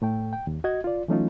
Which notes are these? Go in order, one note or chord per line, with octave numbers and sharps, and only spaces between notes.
A2 A3 G5
G5
D#2
F#4 D#5 G#6
F4 D5
E3 F#3 A3 C#4 D#4 F4